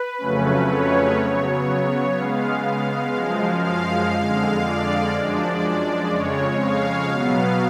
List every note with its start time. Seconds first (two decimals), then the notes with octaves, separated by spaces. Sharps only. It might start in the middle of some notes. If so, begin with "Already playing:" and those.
Already playing: B4
0.18 F2 C#3 F#3 A3 C#4
0.68 C#5
1.17 C#3 F#3 B3 C#5
2.15 C#3 G#3 B3 F5
3.14 F#2 F3 G#3
3.64 F5
4.12 F2 D3 G#3
4.62 D5
5.12 F#2 F3 G#3 D4
6.09 F2 C#3 G#3 C#5
6.59 F5
7.09 B2 F#3 B3